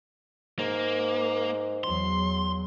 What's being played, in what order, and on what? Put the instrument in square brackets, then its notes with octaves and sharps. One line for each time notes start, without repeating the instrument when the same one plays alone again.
[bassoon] G#2 [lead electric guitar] A#3
[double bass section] E2 F#3 [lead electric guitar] C6